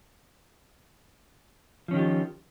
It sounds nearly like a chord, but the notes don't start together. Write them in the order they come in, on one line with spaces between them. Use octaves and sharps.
F3 C#4 D#3 G4 F4